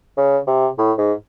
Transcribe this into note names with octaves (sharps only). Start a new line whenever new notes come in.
C#3
C3
A2
G#2